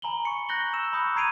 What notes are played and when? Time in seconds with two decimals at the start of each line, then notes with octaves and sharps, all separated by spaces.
0.02 G#5 A#5 B5 F#7 G7
0.25 C#6 C#7
0.49 F#6 G6 A#6 F#7 G7
0.73 E6 E7
0.93 B5 C#6 D#6 F#6 G6 C#7
1.16 A#5 G#6 C7 D7 D#7 F7